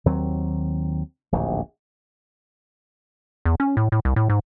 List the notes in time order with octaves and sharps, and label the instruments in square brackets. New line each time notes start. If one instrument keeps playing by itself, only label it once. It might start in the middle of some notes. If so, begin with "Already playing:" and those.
[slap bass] D#2 D#3 F#3 C4
D1 A#1 D#2
[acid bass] E2
C#4
A2
A2
C2
A2
G#2